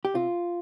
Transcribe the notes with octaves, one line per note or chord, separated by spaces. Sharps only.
G4
C3 F4